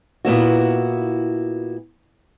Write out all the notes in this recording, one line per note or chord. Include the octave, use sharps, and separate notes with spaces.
A#2 B3 E4 F#4